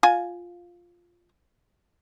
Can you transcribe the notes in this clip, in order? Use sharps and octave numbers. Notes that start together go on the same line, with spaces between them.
F4 G#5